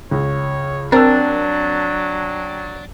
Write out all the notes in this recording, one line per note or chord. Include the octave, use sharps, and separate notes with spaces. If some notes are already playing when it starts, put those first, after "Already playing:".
C#2 C#5
F#3 C4 D4 A#4 G5 A5 E6